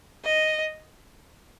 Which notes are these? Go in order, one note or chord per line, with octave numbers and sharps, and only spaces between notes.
D#5